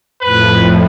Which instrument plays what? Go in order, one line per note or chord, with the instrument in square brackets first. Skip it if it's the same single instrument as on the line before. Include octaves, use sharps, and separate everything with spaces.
[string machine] F2 A2 [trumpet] B4